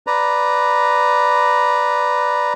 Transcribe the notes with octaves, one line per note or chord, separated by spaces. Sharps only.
B4 D5 A#5